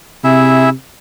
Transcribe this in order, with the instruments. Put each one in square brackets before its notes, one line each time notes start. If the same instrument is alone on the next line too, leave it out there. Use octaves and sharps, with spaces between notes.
[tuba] C3 [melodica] E4 G#4 E5